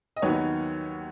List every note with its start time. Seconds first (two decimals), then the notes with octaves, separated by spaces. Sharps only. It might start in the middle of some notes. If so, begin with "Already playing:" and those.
0.16 D#5
0.22 D#2 D#3 F#3 B3 C#5